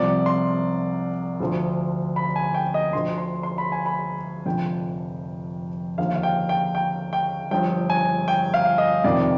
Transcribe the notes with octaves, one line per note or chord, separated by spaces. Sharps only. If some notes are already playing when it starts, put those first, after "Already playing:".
Already playing: C2 C3 F3 D5
C6
D2 D3 F3
B5
G#5
G5
D#5
D2 D3 F3 C6
C6
C6
B5
G#5
B5
F1 F2 D3 G5
D#2 D3 F3 F5
F5
G5
G5
G5
G5
G1 G2 F3 G5
G#5
G5
F5
D#5
F1 F2 C3 D#3 D5